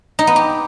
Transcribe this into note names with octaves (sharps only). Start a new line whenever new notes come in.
D#4
B3
G4